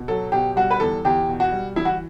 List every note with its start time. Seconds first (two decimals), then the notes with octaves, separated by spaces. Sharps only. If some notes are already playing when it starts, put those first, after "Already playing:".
Already playing: B2
0.08 F#3 A4
0.32 B2 G4
0.56 G3 F#4
0.71 B4
0.80 E2 A4
1.05 E2 G4
1.28 B2
1.40 F#4
1.52 G3
1.76 E3 E4
1.85 F#4